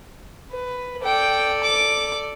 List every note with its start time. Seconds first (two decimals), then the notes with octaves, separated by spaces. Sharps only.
0.52 B4
1.03 A4 D5 G5
1.63 D6